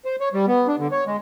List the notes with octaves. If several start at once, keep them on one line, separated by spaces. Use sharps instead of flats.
C5
C#5
G3
B3
D4
D3
C#5
G#3